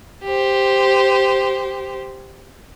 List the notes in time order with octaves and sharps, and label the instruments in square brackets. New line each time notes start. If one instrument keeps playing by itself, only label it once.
[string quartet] G4 C5